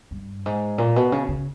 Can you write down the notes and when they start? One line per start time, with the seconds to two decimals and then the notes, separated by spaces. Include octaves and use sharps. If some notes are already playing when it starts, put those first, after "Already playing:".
0.11 G2
0.46 G#2
0.78 A#2
0.96 B2
1.12 C#3
1.29 C#3